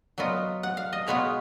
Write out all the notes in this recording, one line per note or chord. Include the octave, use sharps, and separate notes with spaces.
F#3 B3 F4 D#5
F#5
F5
D#5
B2 G#3 B3 F4 C#5